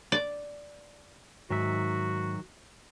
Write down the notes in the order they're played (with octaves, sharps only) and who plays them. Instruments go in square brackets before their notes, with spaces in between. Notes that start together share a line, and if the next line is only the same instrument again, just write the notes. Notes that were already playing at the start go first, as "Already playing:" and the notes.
[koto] D5
[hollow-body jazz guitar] G#2 [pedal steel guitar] D#3 F#3 E5 [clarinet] F#4